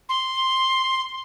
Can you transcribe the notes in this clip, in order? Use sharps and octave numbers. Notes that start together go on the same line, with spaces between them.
C6